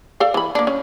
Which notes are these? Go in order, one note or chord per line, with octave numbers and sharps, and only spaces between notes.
A4 D5 F5
E3 B5
A#3 D4
C#4